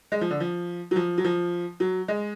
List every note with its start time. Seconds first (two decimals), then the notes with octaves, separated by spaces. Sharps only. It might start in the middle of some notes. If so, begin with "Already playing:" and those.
0.12 G#3
0.21 F3
0.30 D3
0.40 F3
0.91 F#3
0.96 F3
1.18 F#3
1.24 F3
1.80 F#3
2.08 G#3